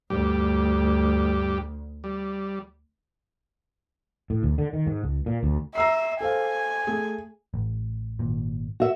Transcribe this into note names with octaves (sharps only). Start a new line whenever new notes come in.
D2 G2 G4
G3
A2
D2
D3
D#3
G#2
C#2
A#2
D2
E5 A#5 E6 C7
A4 C5 F5 G#5
A3 G#4
A1
G#1 A#2
F#4 E5